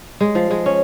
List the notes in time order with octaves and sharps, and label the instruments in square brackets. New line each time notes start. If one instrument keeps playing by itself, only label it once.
[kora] G#3
F3
G#3
C#4